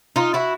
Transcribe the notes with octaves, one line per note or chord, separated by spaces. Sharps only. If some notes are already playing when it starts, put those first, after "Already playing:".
D#4 F4
E4 F#4